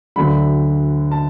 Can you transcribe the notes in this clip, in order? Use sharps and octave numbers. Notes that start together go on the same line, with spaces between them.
D2 D3 F#3 B5
A5